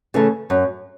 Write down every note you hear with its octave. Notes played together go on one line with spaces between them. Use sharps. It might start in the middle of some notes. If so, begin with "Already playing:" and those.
C#3 E3 A3
F#2